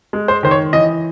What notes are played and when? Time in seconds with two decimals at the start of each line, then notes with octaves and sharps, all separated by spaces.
0.13 G#3
0.28 C5
0.43 D#3 C5
0.51 C#5
0.73 E3 D#5